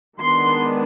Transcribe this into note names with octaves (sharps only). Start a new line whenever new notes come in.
D#3 G#3 B3 D4 C6